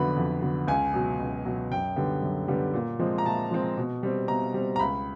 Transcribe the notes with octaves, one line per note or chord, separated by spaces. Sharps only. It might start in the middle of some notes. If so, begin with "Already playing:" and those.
Already playing: F2 D3 F#3 B3 B5
F2
D3 F#3 B3
C#2 G#5
B2 F#3
C#2
B2 F#3
F#2 G5
D3 G3 B3
F#2
D3 G3 B3
A#2
F3 G#3 C4
A#5
A#2 A5
F3 G#3 C4
B2
G3 C4
B2 A#5
G3 C4
A#5
C#2 B5